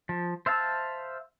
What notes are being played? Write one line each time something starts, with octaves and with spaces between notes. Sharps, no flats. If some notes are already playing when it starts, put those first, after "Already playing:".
F3
C5 E5 F5 A5 E6